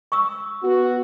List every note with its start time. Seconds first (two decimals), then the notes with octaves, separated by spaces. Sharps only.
0.12 C#6 D#6 E6
0.63 B3 F#4